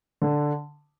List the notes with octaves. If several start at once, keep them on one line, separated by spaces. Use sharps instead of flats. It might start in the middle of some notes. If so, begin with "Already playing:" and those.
D3